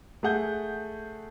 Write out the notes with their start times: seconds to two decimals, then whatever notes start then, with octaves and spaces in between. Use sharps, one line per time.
0.23 A3 G#4 F#5 G6